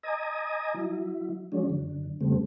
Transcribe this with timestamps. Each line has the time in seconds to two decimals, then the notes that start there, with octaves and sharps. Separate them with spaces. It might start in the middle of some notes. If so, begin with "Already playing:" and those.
0.03 D#5 G#5 A#5 D#6
0.74 F#3 E4
1.52 F3 F#3 G#3 C#4 D4
1.69 F#2 D3
2.21 F2 C#3 G3 A3 C4